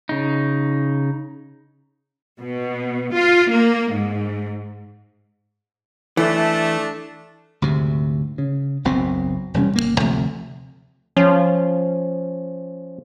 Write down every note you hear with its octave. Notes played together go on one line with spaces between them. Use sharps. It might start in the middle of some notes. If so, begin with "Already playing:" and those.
C#3 D#4
B2
F4
A#3
G#2
E3 A3 D4
D2 G#2 C3
C#3
F#1 B1 B2 C4
E1 C3 G3 C#4
G1 G#2 A#3
D2 C3 F3 A3
F3 C#4